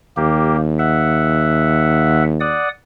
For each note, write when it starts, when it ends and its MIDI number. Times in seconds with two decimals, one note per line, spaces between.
0.17 2.59 39
0.17 0.57 58
0.17 0.57 67
0.79 2.24 76
0.79 2.24 78
2.40 2.69 74
2.40 2.69 78
2.40 2.69 87